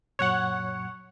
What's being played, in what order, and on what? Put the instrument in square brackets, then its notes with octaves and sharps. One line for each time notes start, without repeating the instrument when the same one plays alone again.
[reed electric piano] F#2 A#2 F#3 [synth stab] C#5 F#5 [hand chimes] C#6 F#6